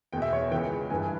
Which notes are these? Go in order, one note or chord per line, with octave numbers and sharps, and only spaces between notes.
E2 B2 G5
E5
C#5
E5
C#2 C#3 E3 G5
G2 E3 G#5